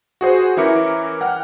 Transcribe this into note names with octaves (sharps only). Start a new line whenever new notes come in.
F#4 G#4 C5
E3 C#4 E4 A#4 D6 C#7
F#5 G5 F6